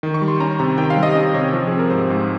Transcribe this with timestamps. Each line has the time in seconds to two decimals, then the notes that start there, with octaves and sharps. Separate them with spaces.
0.03 D#3
0.14 C#6
0.22 G3
0.28 C6
0.40 C#4 A#5
0.59 C3 A#5
0.78 D#3 G5
0.90 F5
0.97 G3
1.03 D#5
1.15 C#4
1.34 C3 C#5
1.53 F3
1.67 C4 G#4
1.79 A#4
1.90 G#2 C5
2.10 G#2